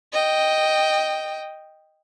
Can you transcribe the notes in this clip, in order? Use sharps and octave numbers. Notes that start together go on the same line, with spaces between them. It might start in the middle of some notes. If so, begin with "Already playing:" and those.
D#5 G5